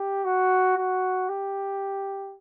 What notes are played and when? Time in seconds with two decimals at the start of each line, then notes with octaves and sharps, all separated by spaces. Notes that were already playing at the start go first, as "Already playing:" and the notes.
Already playing: G4
0.25 F#4
0.77 F#4
1.29 G4